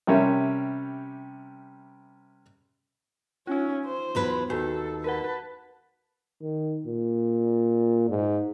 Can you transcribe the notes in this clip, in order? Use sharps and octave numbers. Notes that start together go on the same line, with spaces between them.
C3 G3 C#4 A#4 E5
C#4 D#4 F4
C5
E2 F#3 B4
D#2 F#4 A4 B4
A#4 B4 F#5 A5
D#3
A#2
G#2